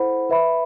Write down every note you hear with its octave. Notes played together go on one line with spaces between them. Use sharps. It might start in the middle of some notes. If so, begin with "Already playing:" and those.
Already playing: E4 A4 C5 F#5 B5
B4 E5 B5